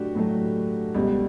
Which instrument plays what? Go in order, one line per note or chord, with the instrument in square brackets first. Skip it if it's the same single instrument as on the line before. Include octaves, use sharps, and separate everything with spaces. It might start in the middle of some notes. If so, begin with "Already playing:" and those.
Already playing: [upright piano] A2 F#3 A3 D4 F#4 G4
A2 F#3 A3
C#2 B2 G3